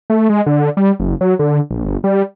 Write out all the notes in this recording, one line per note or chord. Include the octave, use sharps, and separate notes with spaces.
A3
G#3
D3
G3
F#1
F#3
D3
A#1
G1
G3